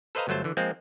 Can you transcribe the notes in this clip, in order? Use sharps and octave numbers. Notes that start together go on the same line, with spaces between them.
A4 B4 C5 D#5 F5 A#5
G1 F#3 A3 C5 A5
D3 E3
F3 G#3 A#3 C4